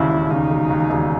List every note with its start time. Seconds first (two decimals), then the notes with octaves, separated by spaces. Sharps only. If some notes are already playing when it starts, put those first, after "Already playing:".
Already playing: E1 D#2 C#3 E4
0.11 C#3
0.30 C#3 D#4
0.50 E1
0.71 D#2
0.90 E1